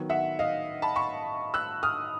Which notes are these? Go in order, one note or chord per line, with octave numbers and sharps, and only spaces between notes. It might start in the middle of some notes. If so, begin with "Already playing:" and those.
Already playing: D#3 F#3 B3
E5 F#5
D#5 F5
A5 B5
B5 C#6
E6 F#6
D#6 F6